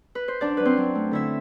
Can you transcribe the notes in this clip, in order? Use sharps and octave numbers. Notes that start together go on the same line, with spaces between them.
B4
C5
F#2 D4 D5
F#3 B4
C4 C5
F#3
A3
D3 E4 E5